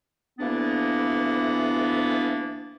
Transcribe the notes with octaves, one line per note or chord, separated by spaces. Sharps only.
D2 E3 A#3 B3 D4